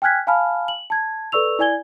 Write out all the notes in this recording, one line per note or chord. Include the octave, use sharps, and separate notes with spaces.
G5 G#5 F6 F#6 G#6 B6
F5 G#5 A5 B5 F6
F#7
A5 G#6
A4 B4 D5 C#6 E6 F7
E4 D5 G#5 G#6 G7